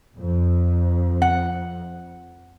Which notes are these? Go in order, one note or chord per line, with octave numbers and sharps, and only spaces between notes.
F2
F#5